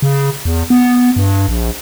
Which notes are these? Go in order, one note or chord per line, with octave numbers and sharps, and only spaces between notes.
C#3
E2
B3
G2
A#1